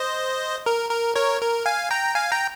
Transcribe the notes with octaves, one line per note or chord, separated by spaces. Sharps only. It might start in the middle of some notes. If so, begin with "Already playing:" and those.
Already playing: C5 D#5
A#4
A#4
A#4 C#5
A#4
F5 G#5
G5 A#5
F5 G#5
G5 A#5